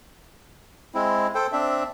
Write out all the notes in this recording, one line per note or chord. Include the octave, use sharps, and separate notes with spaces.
G#3 C4 E4
A4 C5 G5
C4 D4 E5